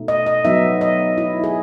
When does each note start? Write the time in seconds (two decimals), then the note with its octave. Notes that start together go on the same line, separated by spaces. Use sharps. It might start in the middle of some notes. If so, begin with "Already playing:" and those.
Already playing: B2 A3 D#4
0.08 D#5
0.27 D#5
0.45 F#3 B3 D#4 E5
0.81 D#5
1.18 E4
1.44 G#4